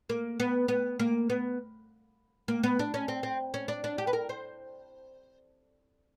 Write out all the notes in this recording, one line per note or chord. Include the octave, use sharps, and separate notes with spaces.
A#3
B3
B3
A#3
B3
A#3
B3
D4
C#4
C4
C4
C#4
D4
D4
G4
B4
A#4
C5